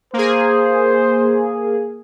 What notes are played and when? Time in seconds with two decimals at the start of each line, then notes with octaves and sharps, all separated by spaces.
0.13 A#3 G#4 C5